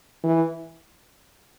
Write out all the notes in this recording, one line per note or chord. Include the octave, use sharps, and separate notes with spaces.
E3